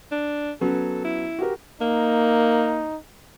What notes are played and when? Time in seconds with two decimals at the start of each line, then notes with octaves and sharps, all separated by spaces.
0.12 D4
0.61 F#3 B3 C#4 A4
1.05 E4
1.39 F#4 G4 A#4
1.81 A#3 D#4